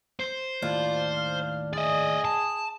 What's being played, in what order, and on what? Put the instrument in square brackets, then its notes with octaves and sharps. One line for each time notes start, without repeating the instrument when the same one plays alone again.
[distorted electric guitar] C5
[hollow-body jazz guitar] D#2 A2 [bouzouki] D4 [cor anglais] F4
[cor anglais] F5
[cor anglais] G#4 [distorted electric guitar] D5 D#5
[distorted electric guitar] A5